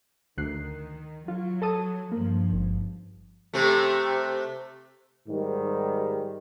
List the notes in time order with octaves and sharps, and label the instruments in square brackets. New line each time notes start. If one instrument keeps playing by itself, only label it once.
[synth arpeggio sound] D2 F#6 C7 [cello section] D#3
[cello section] F#3 [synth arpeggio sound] F4
[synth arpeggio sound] A4 A5 D#6
[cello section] G2 F3 [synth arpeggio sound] A#3
[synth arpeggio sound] G#1
[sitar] C3 A3
[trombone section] G#2 D#3 G3